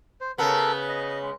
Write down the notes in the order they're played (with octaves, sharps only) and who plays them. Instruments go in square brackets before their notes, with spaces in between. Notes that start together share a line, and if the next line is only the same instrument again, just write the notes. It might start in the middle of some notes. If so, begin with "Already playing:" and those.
[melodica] C5
[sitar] C#3 B3 [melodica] A4 A#4
[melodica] D#5
G#3